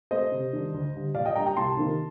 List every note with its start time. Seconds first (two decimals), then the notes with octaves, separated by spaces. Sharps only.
0.11 A3 C4 C5 D#5
0.32 C3
0.53 D#3 G3 D4
0.74 D2
0.94 D3 G3
1.15 A#2 D5 F5
1.25 D#5 G5
1.36 G3 D4 G5 A#5
1.46 G5 A#5
1.57 C2 A5 C6
1.77 C3 D#3 A#3 D#4